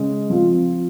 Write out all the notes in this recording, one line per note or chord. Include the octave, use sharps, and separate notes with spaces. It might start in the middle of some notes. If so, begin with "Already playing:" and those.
Already playing: C#3 G#3 C#4
F3 C4 F4